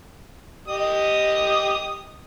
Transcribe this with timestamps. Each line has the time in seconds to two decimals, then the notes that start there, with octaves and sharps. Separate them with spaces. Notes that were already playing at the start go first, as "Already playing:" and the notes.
0.68 G4 D#5 D#6